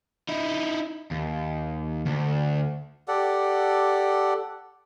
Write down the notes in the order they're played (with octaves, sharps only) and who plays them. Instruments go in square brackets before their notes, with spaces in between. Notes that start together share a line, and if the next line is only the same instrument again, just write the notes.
[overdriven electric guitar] D#4 E4
D#2
D2
[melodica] G4 A4 D5 F#5